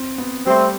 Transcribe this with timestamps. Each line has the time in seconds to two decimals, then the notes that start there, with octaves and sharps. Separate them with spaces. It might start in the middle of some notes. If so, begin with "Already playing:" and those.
Already playing: C4
0.18 B3
0.46 G3 A3 C4